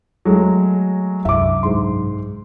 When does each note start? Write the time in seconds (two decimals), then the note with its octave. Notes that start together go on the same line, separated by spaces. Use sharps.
0.25 F#3 G#3 A3
1.25 C2 F#2 E5 D6
1.63 G#2 C6